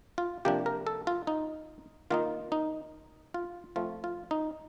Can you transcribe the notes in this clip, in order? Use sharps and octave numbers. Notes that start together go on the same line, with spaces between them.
F4
C3 F3 A#3 D4 G4
A#4
A4
F4
D#4
D#3 A#3 D#4 F4
D#4
F4
F3 A3 C4 F4
F4
D#4